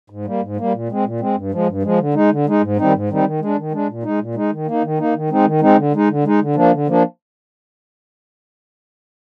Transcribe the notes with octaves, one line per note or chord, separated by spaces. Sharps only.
G#2
G3 A#3
G#2
G3 A#3
A#2
G#3 C4
A#2
G#3 C4
G2
F3 G#3
G2
F3 G#3
D3
G#3 D#4
D3
G#3 D#4
G#2
D#3 G3 C4 D#4
G#2
D#3 G3 C4 D#4
D#3
G#3 D4
D#3
G#3 D4
A#2
G#3 D#4
A#2
G#3 D#4
D#3
A#3 D#4
D#3
A#3 D#4
D#3
G#3 C4 D#4
D#3
G#3 C4 D#4
D3
G#3 D#4
D3
G#3 D#4
D3
F3 A#3 D4
D3
F3 A#3 D4